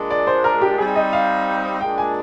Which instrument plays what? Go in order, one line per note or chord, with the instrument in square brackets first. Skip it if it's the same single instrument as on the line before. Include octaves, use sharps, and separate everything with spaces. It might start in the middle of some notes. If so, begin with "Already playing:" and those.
Already playing: [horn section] A#2 G#3 D4
[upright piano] D5
C5
A#4
G4
[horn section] G3 C4 D#4 [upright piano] G#4
[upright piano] D#5
F5
[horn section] A#2 G#3 D4 [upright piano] G5
[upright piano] G#5